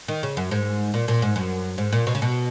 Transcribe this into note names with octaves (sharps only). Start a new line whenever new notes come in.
D#3
C#3
F#2
G#2
A#2
A#2
G#2
F#2
G#2
A#2
B2
C#3
B2